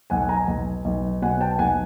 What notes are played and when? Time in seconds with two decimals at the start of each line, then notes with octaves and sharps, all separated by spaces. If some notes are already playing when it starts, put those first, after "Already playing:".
0.10 B1 F#5 G#5
0.29 G#5 A#5
0.48 B1
0.85 B1
1.22 B2 F#5 G#5
1.41 G5 A5
1.59 B1 F#5 G#5